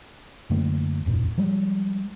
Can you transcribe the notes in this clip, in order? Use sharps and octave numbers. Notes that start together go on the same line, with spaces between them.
F#2 D3 A3 A#3
E1 F#2 A#2
F3 G3 G#3